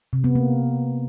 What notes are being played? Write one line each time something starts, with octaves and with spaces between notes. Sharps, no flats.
C3
B3
A#3